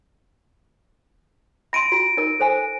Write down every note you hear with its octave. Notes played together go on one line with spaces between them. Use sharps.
B5 C6 A#6 D7 D#7
F4 F#4
D#4 A#4
A4 C5 G#5